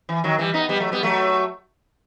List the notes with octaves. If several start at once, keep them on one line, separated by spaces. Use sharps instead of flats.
E3
D#3 F#3
E3 G3
B3 D#4
G3 B3
F#3 A3
G3 B3
F#3 A3